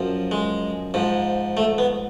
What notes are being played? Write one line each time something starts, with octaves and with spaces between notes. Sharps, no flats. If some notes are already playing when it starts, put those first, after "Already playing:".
Already playing: F#2 F3
G#3
G#2 F3
A3
B3